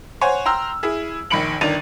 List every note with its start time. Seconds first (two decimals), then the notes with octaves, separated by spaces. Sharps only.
0.21 C5 C#5 F#5 G#5
0.45 G5 A#5 C6 E6 F6
0.83 E4 G#4
1.30 A#1 D#3 B5 C#7 D7 F#7
1.61 G1 D#3 D4 A6 D#7 F7